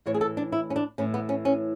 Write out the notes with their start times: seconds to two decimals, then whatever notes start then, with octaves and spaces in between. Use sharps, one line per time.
0.06 A2 E3 C#5
0.14 G#4
0.21 A4
0.37 D4
0.52 E4
0.70 C#4
0.76 D4
0.98 A2 E3 C#4
1.14 B3
1.29 C#4
1.45 C#4